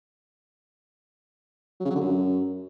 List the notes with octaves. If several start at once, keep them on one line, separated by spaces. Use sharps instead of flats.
F#3
C#3
F#3
D3
F#2